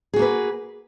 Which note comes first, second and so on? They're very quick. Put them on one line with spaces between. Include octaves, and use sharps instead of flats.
G#4 F#4 A#3 B4